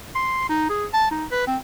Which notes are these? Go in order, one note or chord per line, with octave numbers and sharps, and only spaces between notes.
C6
D#4
G#4
A5
D#4
B4
C4